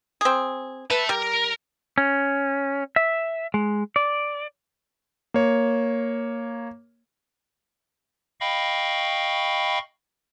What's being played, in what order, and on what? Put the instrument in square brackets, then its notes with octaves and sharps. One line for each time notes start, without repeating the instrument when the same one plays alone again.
[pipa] C4 G#4
[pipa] B4 [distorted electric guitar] E5 A5
[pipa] G3 [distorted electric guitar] A#4
[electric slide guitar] C#4
E5
G#3
D5
[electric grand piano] A#3 C#5
[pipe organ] D#5 F5 G5 B5 C#6